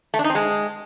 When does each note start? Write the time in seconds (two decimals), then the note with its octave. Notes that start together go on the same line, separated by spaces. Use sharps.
0.14 A3
0.19 D4
0.24 D#4
0.30 C4
0.35 G#3